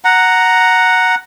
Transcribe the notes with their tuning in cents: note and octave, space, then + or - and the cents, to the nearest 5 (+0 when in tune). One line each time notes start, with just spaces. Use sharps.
F#5 +0 A#5 +0